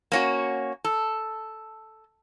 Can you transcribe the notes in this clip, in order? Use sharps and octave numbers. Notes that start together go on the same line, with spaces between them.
A#3 C#4 F#4
A4